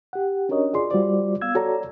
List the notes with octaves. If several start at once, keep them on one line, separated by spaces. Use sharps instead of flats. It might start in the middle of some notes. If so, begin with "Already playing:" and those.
G4 F#5
C#4 D4 F#4 A#4 C#5 D#5
F4 G#4 D5 C6
G3 F4 F#4 C5 D5
B3 F5 E6 G#6
F#4 A4 C#5 D5 A#5